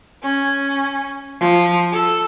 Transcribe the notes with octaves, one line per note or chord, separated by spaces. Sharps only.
C#4
F3
A4